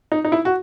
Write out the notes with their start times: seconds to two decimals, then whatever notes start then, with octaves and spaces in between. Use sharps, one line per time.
0.12 D#4
0.25 D#4
0.32 E4
0.45 F#4